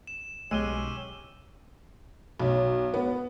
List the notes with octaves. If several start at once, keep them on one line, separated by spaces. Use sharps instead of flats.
E7
B1 G#3 C#4 G4 C#5 E6 D#7 G7
B1
B3